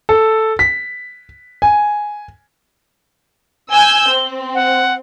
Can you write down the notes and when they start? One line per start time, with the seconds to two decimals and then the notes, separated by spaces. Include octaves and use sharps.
0.09 A4
0.59 B6
1.62 G#5
3.71 G#5 E6 G6 G7
4.10 C4
4.55 F#5